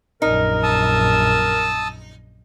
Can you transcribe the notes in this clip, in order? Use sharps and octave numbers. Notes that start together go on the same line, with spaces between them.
A#1 F#2 D#4 A#4
A5 D#6 E6